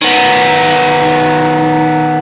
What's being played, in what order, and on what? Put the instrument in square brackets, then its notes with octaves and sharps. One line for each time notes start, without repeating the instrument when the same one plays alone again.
[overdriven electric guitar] D#3 B3